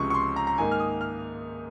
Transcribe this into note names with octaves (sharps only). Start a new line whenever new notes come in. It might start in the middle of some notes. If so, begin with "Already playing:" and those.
Already playing: C#2 C3 F3 G#3 C#4 C#6
C#6
C6
A#5
A#5
G#2 D#3 A#3 G#5
F6
D#6
F6